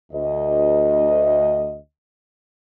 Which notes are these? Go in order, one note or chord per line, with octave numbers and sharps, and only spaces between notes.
D2 D#5